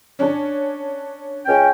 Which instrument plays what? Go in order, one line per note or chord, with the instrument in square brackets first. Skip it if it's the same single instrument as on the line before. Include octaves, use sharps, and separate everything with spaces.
[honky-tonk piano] C#4 D4
[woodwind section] C#2 C#4 G5